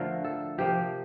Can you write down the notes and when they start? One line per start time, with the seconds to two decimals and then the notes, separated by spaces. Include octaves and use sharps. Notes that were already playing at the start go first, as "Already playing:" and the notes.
Already playing: D3 F3 A3 A#4
0.24 A4
0.58 C3 F3 A#3 G4